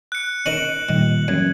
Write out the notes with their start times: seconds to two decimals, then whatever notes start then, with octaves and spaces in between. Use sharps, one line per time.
0.12 F#6 C#7
0.46 C#4 D#4 A#4 C#7 D7 E7 F#7
0.89 A#2 D#3 G3
1.28 F#2 E3 C#4 G#6